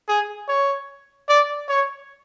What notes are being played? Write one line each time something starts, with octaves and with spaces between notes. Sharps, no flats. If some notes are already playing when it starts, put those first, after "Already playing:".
G#4
C#5
D5
C#5